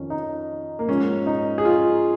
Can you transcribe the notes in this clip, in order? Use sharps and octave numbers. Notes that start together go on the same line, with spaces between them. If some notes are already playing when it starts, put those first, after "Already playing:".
Already playing: F2 D#3 C#4
D#4
A#3
G#2 F3 C#4
D#4
G#4
F4